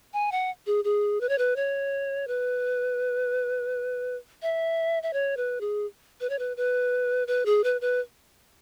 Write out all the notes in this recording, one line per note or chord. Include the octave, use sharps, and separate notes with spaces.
G#5
F#5
G#4
G#4
B4
C#5
B4
C#5
B4
E5
E5
C#5
B4
G#4
B4
C#5
B4
B4
B4
G#4
B4
B4